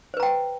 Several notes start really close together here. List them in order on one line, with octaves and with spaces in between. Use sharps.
C5 B4 A#5 G5